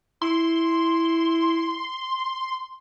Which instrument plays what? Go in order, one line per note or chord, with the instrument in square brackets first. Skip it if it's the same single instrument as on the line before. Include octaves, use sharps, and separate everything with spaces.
[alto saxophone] E4 [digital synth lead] C6